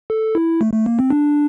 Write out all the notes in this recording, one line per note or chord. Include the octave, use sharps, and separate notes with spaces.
A4
E4
A3
A3
A#3
C4
D4